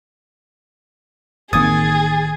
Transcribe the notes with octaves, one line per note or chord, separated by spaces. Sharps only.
A1 D#3 A#3 C4 G#4 D#6 G#6 A6